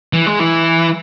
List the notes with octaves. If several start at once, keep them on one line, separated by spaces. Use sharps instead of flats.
E3
G#3
E3